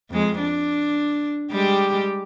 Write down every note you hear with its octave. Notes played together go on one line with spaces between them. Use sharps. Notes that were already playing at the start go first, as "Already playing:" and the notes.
F2 G#3
D4
G3 G#3 G4